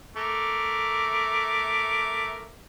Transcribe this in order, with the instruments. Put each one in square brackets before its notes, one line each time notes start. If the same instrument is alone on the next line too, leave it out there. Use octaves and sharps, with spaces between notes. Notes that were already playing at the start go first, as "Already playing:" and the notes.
[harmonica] A3 A#4 D6